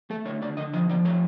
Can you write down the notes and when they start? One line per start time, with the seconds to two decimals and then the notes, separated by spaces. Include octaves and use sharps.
0.10 A3 A4
0.25 D3 C#5
0.42 D3 D5
0.57 D3 D#5
0.73 F3 D#5
0.89 F3 D5
1.05 A3 C#5